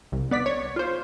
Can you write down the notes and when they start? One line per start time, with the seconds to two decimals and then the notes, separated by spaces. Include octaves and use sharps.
0.12 C2
0.31 B3 D5 B6
0.46 C#5
0.76 F4 C5